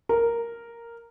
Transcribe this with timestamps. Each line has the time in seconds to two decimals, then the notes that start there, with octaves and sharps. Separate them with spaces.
0.09 A#4